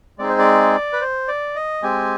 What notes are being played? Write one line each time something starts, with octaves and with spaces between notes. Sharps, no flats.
G#3 C4 D#4 G#4 D5
C5
D5
B4
C5
D5
D#5
G#3 C4 G4 G#5